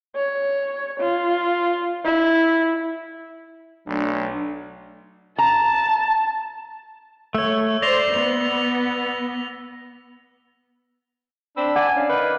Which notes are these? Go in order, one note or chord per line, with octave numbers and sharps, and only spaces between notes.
C#5
F4
E4
B1 F#3 A3 D4
A5 A#5
A3 C#5 E6
C5 D5 A#6 F7 G7
B3 F7
C4 D4 B5 E6
D5 F#5 G#5
C#4 D5 F5
D#3 B4